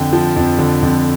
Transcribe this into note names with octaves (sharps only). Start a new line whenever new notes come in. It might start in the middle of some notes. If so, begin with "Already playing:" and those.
Already playing: F2 D3 G5
F3
F2
D3
F2